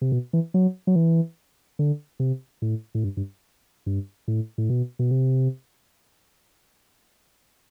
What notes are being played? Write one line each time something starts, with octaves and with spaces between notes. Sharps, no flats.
C3
B2
E3
F#3
F#3
E3
D3
C3
A2
A2
G2
G2
G2
A2
A2
B2
B2
C3